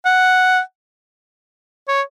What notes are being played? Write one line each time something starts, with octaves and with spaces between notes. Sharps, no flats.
F#5
C#5